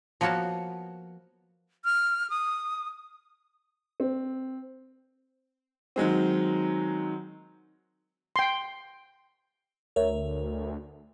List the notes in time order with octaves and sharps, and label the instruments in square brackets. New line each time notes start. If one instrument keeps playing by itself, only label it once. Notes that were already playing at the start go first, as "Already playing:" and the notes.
[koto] F3 A#3 B3 F#4 C#5 A5
[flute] F6
D#6
[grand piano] C4
D#3 F#3 G#3 C4
[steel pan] G5 C6
[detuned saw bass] D2 [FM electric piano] A#4 C#5 E5